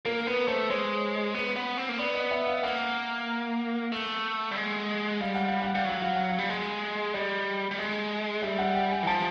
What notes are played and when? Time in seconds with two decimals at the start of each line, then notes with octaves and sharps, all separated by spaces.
0.05 A#3 A#4
0.27 B3 B4
0.48 A3 C5
0.70 G#3 C#5
1.35 B3
1.56 B3
1.77 C4
1.89 A#3
1.98 B3 D5
2.15 D#5
2.31 E5
2.47 F5
2.63 A#3 F#5
3.92 A3
4.51 G3
4.56 G#3
5.20 G3 F5
5.35 F#5
5.48 F5
5.62 F#5
5.75 G3 F5
5.85 F#3 F#5
6.02 F5
6.16 F#5
6.29 F5
6.38 G3
6.49 G#3
7.14 G3 D#5
7.71 G3
7.79 G#3
8.42 G3 E5
8.59 F#5
8.75 G5
8.91 G#5
9.03 E3
9.07 F3 A5